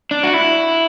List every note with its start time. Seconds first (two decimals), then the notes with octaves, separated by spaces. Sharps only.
0.11 D4
0.23 F#4
0.34 E4